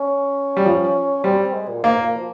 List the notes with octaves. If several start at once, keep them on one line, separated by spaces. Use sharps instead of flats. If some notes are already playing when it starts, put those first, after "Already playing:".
Already playing: C#4
G3
F3
G3 C4
C4
G#3
A#2
G#2 A#3
A#2
F3